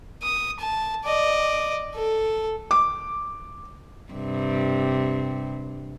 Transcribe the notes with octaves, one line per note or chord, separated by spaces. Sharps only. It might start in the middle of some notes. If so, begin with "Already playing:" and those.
D#6
A5
D5 D#5
A4
D6
G2 C3